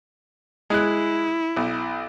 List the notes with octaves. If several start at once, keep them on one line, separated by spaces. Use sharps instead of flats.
G#3 E4 F#6
B1